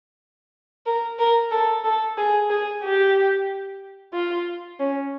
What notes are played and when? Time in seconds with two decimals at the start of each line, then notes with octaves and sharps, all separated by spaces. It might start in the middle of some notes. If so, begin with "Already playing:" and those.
0.86 A#4
1.19 A#4
1.51 A4
1.84 A4
2.17 G#4
2.50 G#4
2.83 G4
4.14 F4
4.79 C#4